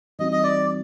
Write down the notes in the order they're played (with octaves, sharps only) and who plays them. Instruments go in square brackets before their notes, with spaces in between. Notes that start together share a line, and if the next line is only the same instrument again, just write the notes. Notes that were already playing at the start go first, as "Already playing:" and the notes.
[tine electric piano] E3 G3 C4 D#4 F#4 [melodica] D#5
[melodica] D#5
D5